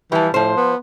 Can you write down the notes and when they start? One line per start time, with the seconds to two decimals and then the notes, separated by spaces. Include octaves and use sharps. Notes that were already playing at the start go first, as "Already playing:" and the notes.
0.12 E3 F3 G3
0.34 A2 F3 C5
0.57 B3